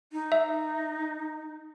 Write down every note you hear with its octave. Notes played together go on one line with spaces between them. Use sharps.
D#4
E5